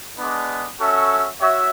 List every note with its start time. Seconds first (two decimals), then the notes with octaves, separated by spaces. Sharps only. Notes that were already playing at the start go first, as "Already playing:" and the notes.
0.19 G#3 B3 D4
0.80 C#4 F#4 A4 E5
1.41 F#4 C#5 E5